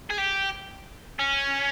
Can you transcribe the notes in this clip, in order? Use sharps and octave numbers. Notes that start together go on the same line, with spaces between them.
G#4
G4
C#4